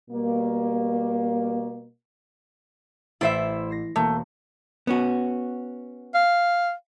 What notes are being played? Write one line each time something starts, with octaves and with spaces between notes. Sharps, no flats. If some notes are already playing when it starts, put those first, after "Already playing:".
B2 G3 A#3
A1 E4 C5 E5 A6
A#6 C7
E1 A3 A#3
B3 C#4 F#4
F5